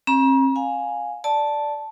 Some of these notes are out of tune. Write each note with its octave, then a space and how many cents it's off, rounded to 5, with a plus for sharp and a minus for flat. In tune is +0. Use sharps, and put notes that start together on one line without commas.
C4 +40 A#5 +40
F5 +20 G#5 +0
D5 +0 A5 +0